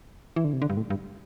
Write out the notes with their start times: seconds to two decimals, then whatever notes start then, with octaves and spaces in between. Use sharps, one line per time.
0.36 E3
0.44 D3
0.53 C3
0.62 D3
0.70 G2
0.77 A2
0.90 G2